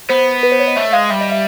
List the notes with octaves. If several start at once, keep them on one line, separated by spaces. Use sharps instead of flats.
B3 C5
B4
C5
C#5
D#5
A3 E5
G#3 F5
G3 E5
D#5
E5